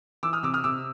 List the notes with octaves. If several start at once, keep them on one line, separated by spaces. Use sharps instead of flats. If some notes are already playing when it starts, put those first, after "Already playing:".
E3 D6 E6
D#6 F6
C3 D6 E6
D#6 F6
C3 D6 E6